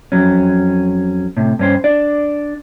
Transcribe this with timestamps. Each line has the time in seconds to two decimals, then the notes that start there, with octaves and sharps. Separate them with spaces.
0.12 F2 F#3 C#4
1.37 A2 C3
1.59 G2 C#4 C5
1.84 D4 D5